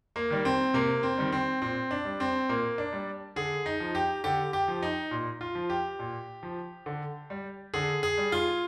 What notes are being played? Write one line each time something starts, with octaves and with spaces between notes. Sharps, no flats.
A#3
D#3 G3
C4
C3 A#3
C4
D#3 G3
C4
A#2 C4
D4
G3
C4
A#2 A#3
D4
G3
D3 G#4
D#4
F3
G4
D3 G4
G4
F3
D#4
A#2
F4
F3
G4
A#2
F3
D3
G3
D3 G#4
G#4
G3
F4